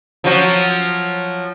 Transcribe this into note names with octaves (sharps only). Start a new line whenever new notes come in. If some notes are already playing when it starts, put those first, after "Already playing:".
F3 F#3 F#4